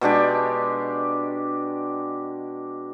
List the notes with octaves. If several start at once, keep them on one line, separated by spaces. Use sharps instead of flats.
B2 G#3 D4 G4